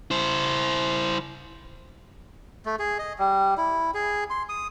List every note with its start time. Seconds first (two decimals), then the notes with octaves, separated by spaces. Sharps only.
0.11 E4 C5
2.66 A3
2.79 G#4
2.99 D#5
3.19 G3
3.58 E4
3.94 G#4
4.30 C6
4.49 D#6